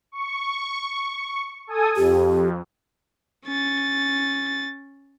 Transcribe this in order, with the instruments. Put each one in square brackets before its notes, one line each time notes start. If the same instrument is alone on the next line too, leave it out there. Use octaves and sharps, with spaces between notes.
[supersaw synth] C#6
A4 G#5 D#6
[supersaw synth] F2 [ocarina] G4
[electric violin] C#4 A6